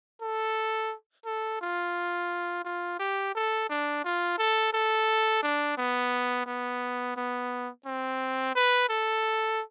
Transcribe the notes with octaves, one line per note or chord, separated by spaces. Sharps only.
A4
A4
F4
F4
G4
A4
D4
F4
A4
A4
D4
B3
B3
B3
C4
B4
A4